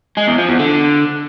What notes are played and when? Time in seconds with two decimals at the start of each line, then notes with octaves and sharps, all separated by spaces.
0.17 G#3
0.28 E2
0.38 F3
0.49 E2
0.59 D3